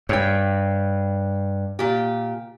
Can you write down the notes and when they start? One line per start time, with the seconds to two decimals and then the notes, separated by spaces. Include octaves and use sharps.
0.09 G2 C#5 G5
1.79 A#2 G4